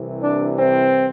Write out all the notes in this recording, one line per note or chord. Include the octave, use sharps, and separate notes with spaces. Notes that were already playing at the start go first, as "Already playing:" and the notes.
Already playing: C2 C3 E3
D4
C4